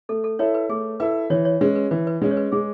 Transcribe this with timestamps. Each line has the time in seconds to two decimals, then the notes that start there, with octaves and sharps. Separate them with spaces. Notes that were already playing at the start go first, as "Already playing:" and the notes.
0.09 A3 A4
0.24 A4
0.39 E4 A4 C#5 E5
0.54 B4
0.69 A3 G#4
1.00 E4 A4 B4 E5
1.30 E3 C#5
1.45 C#5
1.61 G#3 C#4 B4
1.76 B4
1.91 E3 B4
2.07 B4
2.22 G#3 C#4 B4
2.31 C#5
2.37 B4
2.52 G#3 G#4